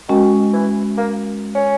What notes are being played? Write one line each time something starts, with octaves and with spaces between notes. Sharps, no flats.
D#3 G#3 C#4 F#4
E3
A#3
C#4